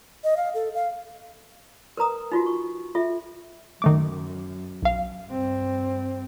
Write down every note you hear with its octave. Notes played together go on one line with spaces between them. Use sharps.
D#5
F5
A4
F5
A#4 B4 A#5 D#6
D#4 F4 F#4
C#6
F4 A4 E5
F#2 D#3 A3 D6
B1 F5
G2 C4